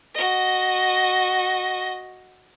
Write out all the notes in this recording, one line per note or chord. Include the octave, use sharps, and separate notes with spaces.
F#4 D#5